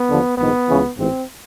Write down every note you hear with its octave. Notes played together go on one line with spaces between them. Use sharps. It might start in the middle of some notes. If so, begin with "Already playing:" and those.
Already playing: B3
D#2 D3 F3
A#1 G#2 D#3 B3
C#2 C#3 E3
A1 G#2 E3 C4